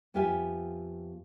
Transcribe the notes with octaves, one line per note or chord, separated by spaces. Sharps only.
F2 B3 F4 G4 E5 G#5